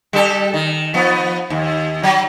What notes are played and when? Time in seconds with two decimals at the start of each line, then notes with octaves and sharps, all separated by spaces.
0.13 G3 G4 A4
0.54 D#3
0.94 F3 B3
1.50 D#2
2.03 F#3